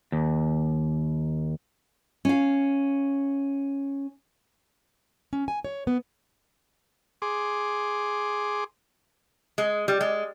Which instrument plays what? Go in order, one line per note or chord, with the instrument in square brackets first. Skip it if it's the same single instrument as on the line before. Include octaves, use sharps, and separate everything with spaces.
[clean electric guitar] D#2
[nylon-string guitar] C#4 F5
[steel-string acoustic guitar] C#4
G#5
C#5
B3
[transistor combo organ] G#4 C6 D6
[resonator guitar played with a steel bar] G#3
G3
G#3